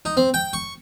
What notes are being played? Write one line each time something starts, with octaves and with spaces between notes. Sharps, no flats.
D#4
C4
G5
C#6